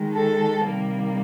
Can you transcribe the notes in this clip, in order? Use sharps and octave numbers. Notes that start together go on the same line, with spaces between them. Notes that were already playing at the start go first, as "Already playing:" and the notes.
Already playing: D#3 G#3
A4
C3 D#3 G3 A#3